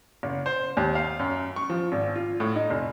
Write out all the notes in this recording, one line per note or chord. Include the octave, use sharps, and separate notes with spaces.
F#1
C5
D#2
F5
F#2
C#6
F3
G#1
F4
A2
D#4
F1